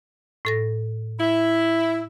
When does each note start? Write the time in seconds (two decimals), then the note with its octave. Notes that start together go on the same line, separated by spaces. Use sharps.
0.45 A2 A4 A#6
1.19 E4